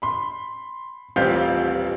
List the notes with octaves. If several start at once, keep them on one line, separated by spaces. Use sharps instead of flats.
B5 C6
D#1 A1 C4 F4 G4 G6